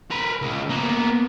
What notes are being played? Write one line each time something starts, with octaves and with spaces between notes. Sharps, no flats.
A#4 B4
C#2
A#3 B3